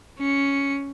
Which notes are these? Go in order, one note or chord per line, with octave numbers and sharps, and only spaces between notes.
C#4 C#7